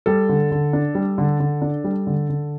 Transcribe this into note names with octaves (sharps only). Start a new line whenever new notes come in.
G3 A4
D3
D3
D4
G3
D3
D3
D4
G3
D3
D3